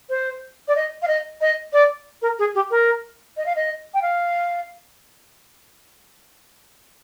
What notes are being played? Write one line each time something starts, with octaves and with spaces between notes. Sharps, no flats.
C5
D5
D#5
F5
D#5
D#5
D5
A#4
G#4
G4
A#4
D#5
F5
D#5
G5
F5